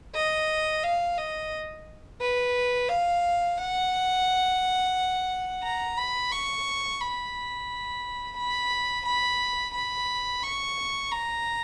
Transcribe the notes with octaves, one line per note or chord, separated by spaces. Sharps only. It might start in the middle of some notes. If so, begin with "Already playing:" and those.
D#5
F5
D#5
B4
F5
F#5
A#5
B5
C#6
B5
B5
B5
B5
C#6
A#5